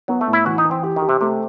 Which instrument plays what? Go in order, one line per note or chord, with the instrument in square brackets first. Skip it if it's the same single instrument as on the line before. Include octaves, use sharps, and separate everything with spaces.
[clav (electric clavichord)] F#3 [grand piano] B3
[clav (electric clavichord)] A3
[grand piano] A2
[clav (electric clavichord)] E4
[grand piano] E3 [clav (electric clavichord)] F#4
[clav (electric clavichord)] D#4
[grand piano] E3
[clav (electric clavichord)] C4
[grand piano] G4
[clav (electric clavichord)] D#3
[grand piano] G4
[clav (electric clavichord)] C3
[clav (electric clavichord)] C3 [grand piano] A3